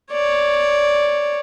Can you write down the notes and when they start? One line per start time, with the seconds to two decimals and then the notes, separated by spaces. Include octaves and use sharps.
0.12 C#5 D5